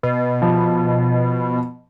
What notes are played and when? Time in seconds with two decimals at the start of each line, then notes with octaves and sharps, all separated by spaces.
0.03 B2
0.42 F3